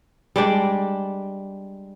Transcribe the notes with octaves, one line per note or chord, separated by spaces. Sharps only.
G3 G#3 D4